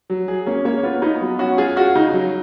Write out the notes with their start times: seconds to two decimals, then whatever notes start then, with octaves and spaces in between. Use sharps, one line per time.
0.10 F#3
0.28 G#4
0.46 A#3 C#4
0.65 A#3 C#5
0.83 B3 F4
1.02 B3 D#4
1.21 F#3
1.39 C#4 F#4
1.58 F4 G#4
1.76 F4 F#4
1.95 C#3 D#4
2.13 F#3